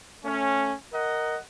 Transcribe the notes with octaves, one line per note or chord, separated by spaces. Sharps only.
A3 C#4
A#4 D#5 F#5